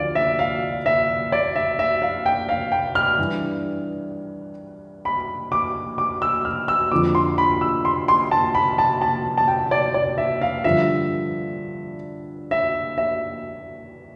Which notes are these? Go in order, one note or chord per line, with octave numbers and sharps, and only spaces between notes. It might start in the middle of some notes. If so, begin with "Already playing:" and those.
Already playing: D2 D3 F3 D5 F5
E5
F5
E5
D5
E5
E5
F5
G5
F5
G5
F6
G2 E3
B5
D6
D6
E6
F6
E6
F2 D3 F3 D6
C6
B5
E6
C6
C6
A5
B5
A5
A5
A5
G5
D5
D5
E5
F5
G2 D3 F3 E5
E5
E5